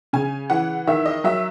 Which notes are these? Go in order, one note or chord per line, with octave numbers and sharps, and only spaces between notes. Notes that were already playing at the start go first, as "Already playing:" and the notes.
C#3 G#5
E3 F#5
D#3 E5
D#5
F#3 E5